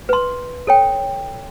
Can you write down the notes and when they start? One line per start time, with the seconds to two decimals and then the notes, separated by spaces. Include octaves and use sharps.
0.09 B4 C6
0.67 A4 C#5 G5